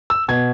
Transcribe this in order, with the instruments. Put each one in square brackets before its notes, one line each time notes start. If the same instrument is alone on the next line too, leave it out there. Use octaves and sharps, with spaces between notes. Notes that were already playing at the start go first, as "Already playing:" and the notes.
[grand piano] E6
B2 G#6